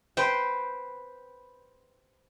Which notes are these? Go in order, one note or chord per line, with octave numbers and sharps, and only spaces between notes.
B4 C5 G5